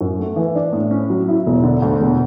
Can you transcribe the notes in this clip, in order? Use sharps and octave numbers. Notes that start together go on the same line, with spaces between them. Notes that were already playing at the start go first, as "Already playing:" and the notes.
F#2
A3
E3
D4
A2
C#4
F#3
E4
E1
D3
D2
E1